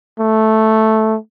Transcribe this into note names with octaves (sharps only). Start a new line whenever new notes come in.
A3